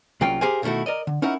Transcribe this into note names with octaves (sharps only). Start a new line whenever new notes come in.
C2 C#3 F#3 A#3 F4 G5
G4 G#4 A#4 C5 F5 G#5
B2 D#3 A3 E4 F#4
A#4 D5 D#5
D3
C#4 D#4 E4 A#4 F#5